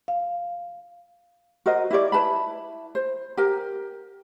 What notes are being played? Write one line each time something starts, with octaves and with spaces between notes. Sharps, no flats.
F5
F#4 A#4 C5 D#5
E4 G4 C#5 D5
E4 B4 A5 B5
C5
G4 A#4